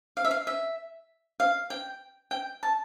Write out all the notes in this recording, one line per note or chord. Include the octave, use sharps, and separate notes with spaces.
F5
E5
F5
E5
F5
G5
G5
A5